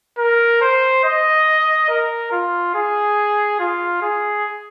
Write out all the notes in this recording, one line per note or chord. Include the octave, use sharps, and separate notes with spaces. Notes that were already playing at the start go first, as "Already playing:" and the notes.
A#4
C5
D#5
A#4
F4
G#4
F4
G#4